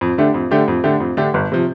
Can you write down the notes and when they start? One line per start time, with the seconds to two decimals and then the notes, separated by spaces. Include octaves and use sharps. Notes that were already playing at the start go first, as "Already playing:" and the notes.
0.01 F2
0.18 D3 A3 D4 G4
0.34 F2
0.51 D3 A3 D4 G4
0.68 F2
0.84 D3 A3 D4 G4
1.00 F2
1.17 D3 A3 D4 G4
1.34 G1
1.52 C3 F3